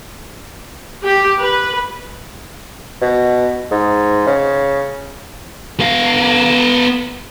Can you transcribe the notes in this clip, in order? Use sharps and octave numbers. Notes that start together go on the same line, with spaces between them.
G4
B4
B2
G#2
C#3
B3 F5